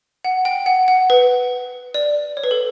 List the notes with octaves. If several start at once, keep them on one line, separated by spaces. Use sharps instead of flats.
F#5
G5
F#5
F#5
B4
D5
C#5
B4
A4